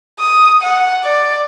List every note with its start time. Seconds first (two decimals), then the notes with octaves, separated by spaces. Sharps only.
0.20 D#6
0.62 F#5
1.04 D5